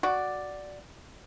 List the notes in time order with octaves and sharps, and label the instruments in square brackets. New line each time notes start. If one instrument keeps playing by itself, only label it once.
[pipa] F#4 D5